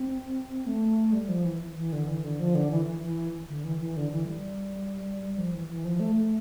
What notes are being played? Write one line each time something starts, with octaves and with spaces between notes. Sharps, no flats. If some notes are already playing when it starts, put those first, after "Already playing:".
Already playing: C4
A3
G3
F3
E3
E3
D3
E3
D3
F3
D3
E3
E3
E3
D3
E3
E3
D3
E3
G3
F3
E3
E3
F3
A3
A3